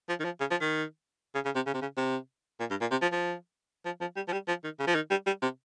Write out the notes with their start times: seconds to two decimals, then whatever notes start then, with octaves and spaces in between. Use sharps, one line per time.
0.09 F3
0.20 D#3
0.25 F3
0.40 C#3
0.50 F3
0.61 D#3
1.34 C#3
1.45 C#3
1.55 C3
1.66 C#3
1.74 C3
1.82 C#3
1.97 C3
2.60 A#2
2.70 G2
2.81 A#2
2.91 C3
3.02 F3
3.12 F3
3.85 F3
4.01 F3
4.16 G3
4.28 F3
4.33 G3
4.48 F3
4.64 D#3
4.79 C#3
4.87 F3
4.95 D#3
5.10 G3
5.26 G3
5.42 C3